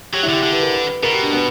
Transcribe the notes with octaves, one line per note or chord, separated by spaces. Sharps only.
F#3 G4
E4
D3 G4
D3 G4
B4
A#4
B4
B2 A#4
G4
D4
B3